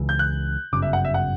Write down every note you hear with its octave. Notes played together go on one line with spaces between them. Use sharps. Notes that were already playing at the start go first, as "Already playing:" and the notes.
Already playing: C#2 C#3 E3
G6
F#6
G1 F#2 C#3 D6
E5
F#5
E5
F#5